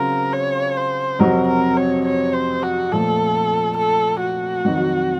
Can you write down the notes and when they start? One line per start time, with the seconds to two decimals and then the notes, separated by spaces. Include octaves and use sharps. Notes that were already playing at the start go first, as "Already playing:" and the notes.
Already playing: C#3 F#3 C4 F4 A#4
0.33 C#5
0.76 C5
1.19 F2 C3 F#3 C4 F#4 A#4
1.48 A#4
1.77 C#5
2.06 C#5
2.34 C5
2.63 F#4
2.92 A#2 F3 A3 A4
3.77 A4
4.21 F#4
4.65 F2 D#3 F#3